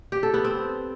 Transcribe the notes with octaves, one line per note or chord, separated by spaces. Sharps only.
G4
A4
B3
C4